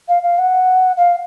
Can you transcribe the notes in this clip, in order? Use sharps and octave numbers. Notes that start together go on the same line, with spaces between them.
F5
F5
F#5
F5